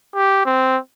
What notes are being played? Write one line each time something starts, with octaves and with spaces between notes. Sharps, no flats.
G4
C4